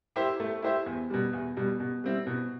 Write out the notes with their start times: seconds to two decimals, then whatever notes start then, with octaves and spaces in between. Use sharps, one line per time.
0.16 E4 G4 C5 E5
0.40 A3
0.62 E4 G4 C5 E5
0.86 E2
1.10 B2 G3
1.33 E2
1.57 B2 G3
1.80 B2
2.04 G3 C4 E4
2.27 B2